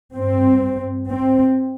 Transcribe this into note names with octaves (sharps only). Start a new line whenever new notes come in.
G2 C4
C4